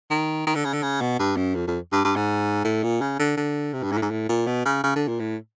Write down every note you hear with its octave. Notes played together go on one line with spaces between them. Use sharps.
D#3
D#3
D3
C#3
D3
C#3
B2
G2
F#2
F2
F2
G2
G2
G#2
A2
A#2
C#3
D3
D3
C3
G2
G#2
A2
G#2
A2
A#2
B2
C#3
C#3
D3
A#2
A2